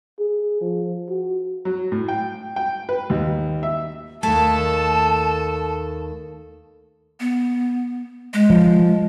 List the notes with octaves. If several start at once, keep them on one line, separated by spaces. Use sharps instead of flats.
G#4
F3
F#4
F#3
A2
G5
G5
B4
D#2
E5
D#2 A3 A4 A5 G#6
B3
G#3
F3